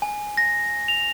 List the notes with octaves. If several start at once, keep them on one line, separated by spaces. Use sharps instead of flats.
G#5
A#6
F7